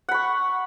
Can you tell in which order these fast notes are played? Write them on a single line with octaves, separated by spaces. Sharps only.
F#5 B5 C#6